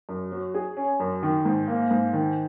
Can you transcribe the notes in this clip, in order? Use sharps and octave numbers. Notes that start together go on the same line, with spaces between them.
F#2
F#3
G#4
C#4
F#2
D#3
G#2
A#3
G#2
D#3